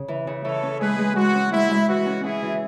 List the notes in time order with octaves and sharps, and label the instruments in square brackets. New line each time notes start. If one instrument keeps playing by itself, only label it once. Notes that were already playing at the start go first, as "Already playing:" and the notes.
Already playing: [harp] C#3
E3
C#3
[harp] E3 [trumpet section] A4 C#5
[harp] C#4
[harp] G#3 [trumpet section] G#4 B4
[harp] G#3
[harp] G#3 [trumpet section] F#4
[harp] C#4
[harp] G#3 [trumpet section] E4
[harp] G#3
[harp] E3 [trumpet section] F#4
[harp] C#4
[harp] C#4 [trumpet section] E4 G#4
[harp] E3